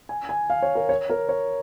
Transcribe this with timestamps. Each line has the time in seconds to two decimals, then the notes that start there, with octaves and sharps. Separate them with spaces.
0.09 G#5
0.29 G#5
0.50 F5
0.62 C#5
0.75 A#4
0.89 C#5
1.10 A#4
1.29 C#5